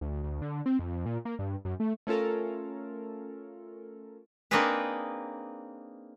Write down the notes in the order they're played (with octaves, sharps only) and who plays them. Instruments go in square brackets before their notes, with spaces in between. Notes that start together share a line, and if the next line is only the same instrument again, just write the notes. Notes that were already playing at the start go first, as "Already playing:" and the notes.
[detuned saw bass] D2
D2
D3
C4
F2
A#2
A#3
G2
F#2
A3
[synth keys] A3 C#4 F4 A4 A#4
[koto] A#3 C4 D4 D#4 G#4 B4